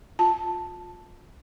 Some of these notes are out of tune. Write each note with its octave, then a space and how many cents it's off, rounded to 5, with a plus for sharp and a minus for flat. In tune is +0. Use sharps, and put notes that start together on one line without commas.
F4 +25 A5 +0